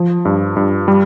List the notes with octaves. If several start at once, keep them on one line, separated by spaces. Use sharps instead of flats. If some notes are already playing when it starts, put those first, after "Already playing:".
Already playing: F3
G2
G2
G3